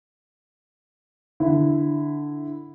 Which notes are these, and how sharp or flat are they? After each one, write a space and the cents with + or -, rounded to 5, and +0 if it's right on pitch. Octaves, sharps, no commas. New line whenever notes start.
D3 +0 E4 +0